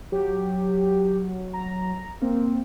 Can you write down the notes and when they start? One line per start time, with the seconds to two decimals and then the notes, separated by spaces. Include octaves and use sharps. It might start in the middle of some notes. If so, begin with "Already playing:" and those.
0.12 F#3 G4
1.53 A#5
2.22 A#3 C4